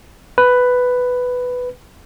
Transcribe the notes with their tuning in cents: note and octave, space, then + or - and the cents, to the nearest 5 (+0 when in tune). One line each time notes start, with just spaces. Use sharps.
B4 +5